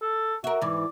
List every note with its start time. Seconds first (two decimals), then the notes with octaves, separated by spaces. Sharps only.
0.02 A4
0.44 F#4 A#4 E5
0.61 G#2 E3 D5